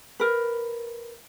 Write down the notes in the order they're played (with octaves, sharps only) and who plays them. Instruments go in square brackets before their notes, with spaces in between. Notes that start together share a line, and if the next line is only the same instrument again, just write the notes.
[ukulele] A#4 B4